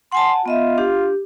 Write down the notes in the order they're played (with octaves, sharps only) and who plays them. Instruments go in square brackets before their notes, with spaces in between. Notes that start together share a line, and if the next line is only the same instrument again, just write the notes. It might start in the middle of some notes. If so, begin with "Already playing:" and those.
[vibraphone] F#5 G#5 A5 [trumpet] C6
[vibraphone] B3 D#5 E5 [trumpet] F4
[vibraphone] D4 G4